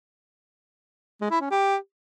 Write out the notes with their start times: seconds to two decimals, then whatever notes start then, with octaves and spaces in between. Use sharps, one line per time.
1.21 G#3
1.31 E4
1.41 C#4
1.51 G4